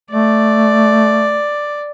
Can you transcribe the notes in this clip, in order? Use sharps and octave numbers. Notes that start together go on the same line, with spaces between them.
A3 D5